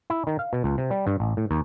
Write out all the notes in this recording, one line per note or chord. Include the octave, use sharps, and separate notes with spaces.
E4
D#3
F5
B2
C#2
C3
G3
G2
A1
A2
D#2